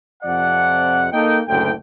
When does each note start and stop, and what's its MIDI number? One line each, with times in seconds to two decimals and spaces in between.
0.23 1.07 41
0.23 1.07 48
0.23 1.07 53
0.23 1.07 74
0.23 1.07 78
1.12 1.39 58
1.12 1.39 63
1.12 1.39 69
1.12 1.39 79
1.48 1.72 30
1.48 1.72 38
1.48 1.72 45
1.48 1.72 79